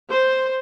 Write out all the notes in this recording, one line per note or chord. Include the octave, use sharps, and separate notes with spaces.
C5